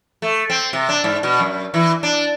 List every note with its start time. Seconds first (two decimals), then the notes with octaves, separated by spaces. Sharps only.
0.22 A3
0.50 C4
0.73 C3
0.89 D4
1.04 G#2
1.23 B2
1.40 F#2
1.74 E3
2.03 D4